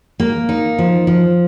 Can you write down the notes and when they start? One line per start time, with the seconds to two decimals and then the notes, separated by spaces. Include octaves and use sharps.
0.20 A#3
0.49 D#4
0.78 F3
1.07 F3